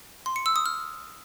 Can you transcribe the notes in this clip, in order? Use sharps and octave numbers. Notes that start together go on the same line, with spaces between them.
C6
C#7
E6
D#6
F6